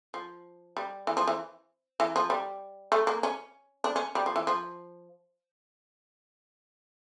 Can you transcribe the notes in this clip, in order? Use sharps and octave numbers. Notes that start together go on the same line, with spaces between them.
F3
G3
E3
F3
E3
E3
F3
G3
A3
A#3
C#4
D4
C#4
G3
F3
E3
F3